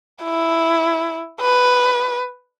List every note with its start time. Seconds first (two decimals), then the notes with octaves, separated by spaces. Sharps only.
0.23 E4
1.40 B4